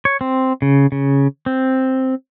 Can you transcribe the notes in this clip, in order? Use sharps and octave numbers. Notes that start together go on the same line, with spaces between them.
C#5
C4
C#3
C#3
C4